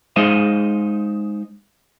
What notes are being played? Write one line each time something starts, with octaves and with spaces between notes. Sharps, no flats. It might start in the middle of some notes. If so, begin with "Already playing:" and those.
G#3 D#4 C5 D#5 F5